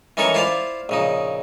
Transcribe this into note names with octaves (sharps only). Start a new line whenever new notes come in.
E3 C#4 D#4 A4 A#4 C#6
E4 F4 C5 D5 F5
A#1 C#3 D#4